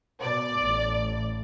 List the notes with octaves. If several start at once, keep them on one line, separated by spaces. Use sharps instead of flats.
B2 D5
A1